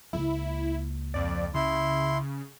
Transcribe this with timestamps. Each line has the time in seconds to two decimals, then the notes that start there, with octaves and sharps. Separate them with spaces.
0.13 C#2 A#3 E4
1.14 F2 D5
1.54 C#3 E4 C6